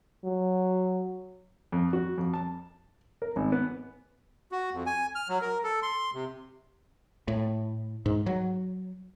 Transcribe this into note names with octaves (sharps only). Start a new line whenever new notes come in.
F#3
F2
F#4
F2
A5
A#4
G#1
B3
F#4
F2
G#5
F6
F#3
A#4
A4
C6
C3
A2
G#2
F#3